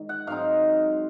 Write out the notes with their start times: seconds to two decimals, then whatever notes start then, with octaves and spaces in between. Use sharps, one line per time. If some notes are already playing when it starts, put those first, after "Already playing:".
Already playing: G#2 D#3
0.09 F#5
0.27 G#2 F#3 C4 D#4 F5